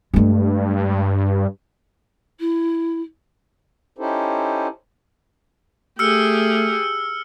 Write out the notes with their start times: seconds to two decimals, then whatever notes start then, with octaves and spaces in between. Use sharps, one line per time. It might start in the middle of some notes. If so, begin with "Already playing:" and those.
0.14 G2 G#3 A3
2.40 E4
3.98 C#4 D#4 E4 G4 A4 C5
5.99 A3 G4 G#4 E6 F6 C#7